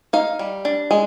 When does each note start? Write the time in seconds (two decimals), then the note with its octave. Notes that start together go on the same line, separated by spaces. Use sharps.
0.13 D#4 F5
0.39 G3
0.65 D4
0.91 G#3